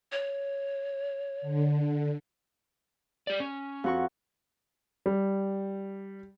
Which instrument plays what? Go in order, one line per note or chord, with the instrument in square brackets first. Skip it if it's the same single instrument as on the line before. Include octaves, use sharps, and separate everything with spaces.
[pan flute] C#5
[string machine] D3
[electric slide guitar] G4 D5
C#4
[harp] F2 F#4 C#6
[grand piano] G3